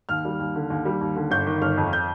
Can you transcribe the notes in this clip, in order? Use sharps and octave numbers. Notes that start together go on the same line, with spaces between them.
D#2 F6
G3
D#2
D3
D#2
G3
D#2
D3
G1 G6
D#3
G1 F6
F2
G6